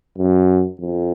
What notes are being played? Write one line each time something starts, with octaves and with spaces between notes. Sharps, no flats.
F#2
F2